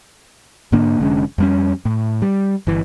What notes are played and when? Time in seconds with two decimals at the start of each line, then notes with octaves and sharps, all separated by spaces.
0.72 G#2 D3 A#3 D4
1.00 F1 D3 G#3 C#4
1.38 F2 G3 C#4
1.85 A2
2.22 G3
2.67 G1 E3